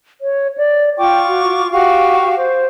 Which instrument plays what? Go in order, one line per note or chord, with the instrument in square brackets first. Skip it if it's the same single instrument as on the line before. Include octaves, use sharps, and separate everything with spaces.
[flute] C#5
D5
[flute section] F4 C#6 D6 [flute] G5
[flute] F#4
[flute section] F#4 G4 F5 [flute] C#6
[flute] C5